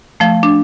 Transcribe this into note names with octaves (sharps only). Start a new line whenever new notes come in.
F3 A3
D4